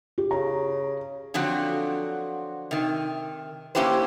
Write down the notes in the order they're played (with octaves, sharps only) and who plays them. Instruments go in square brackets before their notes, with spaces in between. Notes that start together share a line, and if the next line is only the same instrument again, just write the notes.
[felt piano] G4
[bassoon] C#3 [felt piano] A#5
[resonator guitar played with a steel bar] D3 F3 F#3 C4 F#4
C3 D#3
A#3 C#4 E4 G4 B4 C5